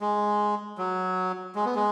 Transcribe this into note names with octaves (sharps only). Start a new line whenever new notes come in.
G#3
F#3
G#3
B3
G#3